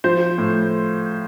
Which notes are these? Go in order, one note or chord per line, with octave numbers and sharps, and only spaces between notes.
F3 C5
A2